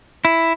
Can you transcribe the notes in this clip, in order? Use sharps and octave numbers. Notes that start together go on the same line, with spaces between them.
E4